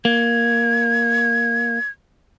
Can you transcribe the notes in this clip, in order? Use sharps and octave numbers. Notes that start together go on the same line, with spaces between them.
A#3 G#6